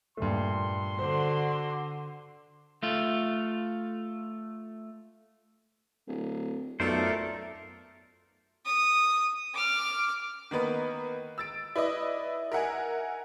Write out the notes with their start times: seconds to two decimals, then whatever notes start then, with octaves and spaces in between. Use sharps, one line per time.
0.17 G2 A#2 A3 C6
0.99 D3 F#4 C5
2.83 A3 F4
6.08 D1
6.80 B1 F#2 A3 F4 A4 A#4 C5 D5
8.65 D#6
9.54 D6 F6
10.51 D#3 A#3 B3 B4
11.38 E6 A6 D7
11.76 E4 B4 D5 D#5
12.52 A#4 E5 F#5 G#5